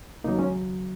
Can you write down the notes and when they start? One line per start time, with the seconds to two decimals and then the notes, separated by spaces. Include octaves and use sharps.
0.24 D#2 C#3 F#3 A#3 D#4
0.38 G#3 C#4